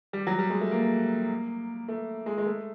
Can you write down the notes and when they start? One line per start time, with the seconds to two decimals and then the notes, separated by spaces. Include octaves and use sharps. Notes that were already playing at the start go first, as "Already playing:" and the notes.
0.13 G3
0.27 F#3
0.39 G3
0.50 G#3
0.61 A3
0.71 A#3
1.88 A3
2.26 G#3
2.38 G#3
2.46 A3